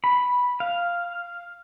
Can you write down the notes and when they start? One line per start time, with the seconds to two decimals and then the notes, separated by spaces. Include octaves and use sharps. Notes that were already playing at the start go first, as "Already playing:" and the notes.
0.04 B5
0.60 F5